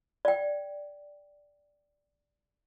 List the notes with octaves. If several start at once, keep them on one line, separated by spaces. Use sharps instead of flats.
D5 G5